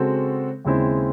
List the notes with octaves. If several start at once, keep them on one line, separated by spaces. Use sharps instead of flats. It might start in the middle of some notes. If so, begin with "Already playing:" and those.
Already playing: C#3 G#3 C4 F#4 A4
D#2 C#3 G#3 C4 E4